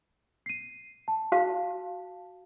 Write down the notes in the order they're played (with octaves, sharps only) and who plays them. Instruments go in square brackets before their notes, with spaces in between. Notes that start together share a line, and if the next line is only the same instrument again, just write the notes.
[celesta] C7 D#7
A5
[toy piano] F#4 F5